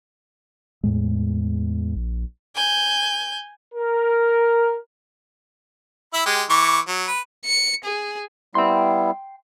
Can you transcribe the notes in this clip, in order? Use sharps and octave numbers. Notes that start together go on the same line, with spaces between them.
E2 A2 G#3
A#1
G#5 G6
A#4
E4 E5 B5
G#3 G4
E3 C#6 D6
F#3
B4
C#7
G#4
G3 B3 E4 G5 C6